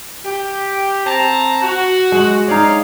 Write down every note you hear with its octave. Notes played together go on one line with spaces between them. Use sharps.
G4
C4 A5 A#5
F#4
G#3
C#4 D#4 D5 F5